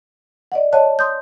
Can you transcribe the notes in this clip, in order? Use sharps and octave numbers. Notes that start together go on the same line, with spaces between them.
D5 D#5 F#5
C#5 D#5 F5 F#5 A5 F#6
C6 D#6 G6